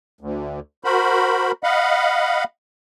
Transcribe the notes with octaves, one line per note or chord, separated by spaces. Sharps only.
D2
F#4 A#4 C5 B5
D#5 F5 F#5 B5